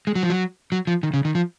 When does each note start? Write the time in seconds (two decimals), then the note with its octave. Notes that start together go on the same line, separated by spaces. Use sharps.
0.07 G#3
0.15 F#3
0.23 F3
0.30 F#3
0.72 F#3
0.87 F3
1.03 D#3
1.14 C#3
1.25 D#3
1.35 F3